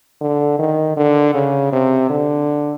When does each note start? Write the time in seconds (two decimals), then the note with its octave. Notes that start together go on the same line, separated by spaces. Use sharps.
0.21 D3
0.59 D#3
0.96 D3
1.34 C#3
1.72 C3
2.10 D3